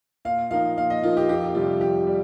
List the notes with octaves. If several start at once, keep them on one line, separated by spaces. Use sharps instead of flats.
A#2 F5
F3 A#3 D#4 F5
A#2 F5
D#5
F3 A#3 D#4 F4
G4
F2 G4
C3 D#3 G3 F4
F2 G4
G3